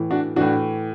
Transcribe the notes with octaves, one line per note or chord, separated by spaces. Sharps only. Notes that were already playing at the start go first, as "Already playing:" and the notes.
Already playing: A2 E3
D4 F#4
A2 E3 D4 F#4